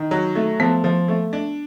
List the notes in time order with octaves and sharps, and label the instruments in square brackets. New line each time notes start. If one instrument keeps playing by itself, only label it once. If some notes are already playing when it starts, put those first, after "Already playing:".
Already playing: [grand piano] D#3
F#3
A3
[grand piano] F3 [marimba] B3
[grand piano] F3
A3
D4